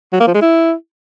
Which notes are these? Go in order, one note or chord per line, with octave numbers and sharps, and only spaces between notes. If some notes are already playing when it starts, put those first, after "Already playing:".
F#3
A#3
F3
G#3
E4